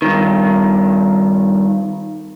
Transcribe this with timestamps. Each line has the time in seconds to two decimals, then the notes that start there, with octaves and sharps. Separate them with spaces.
0.02 G2 D#3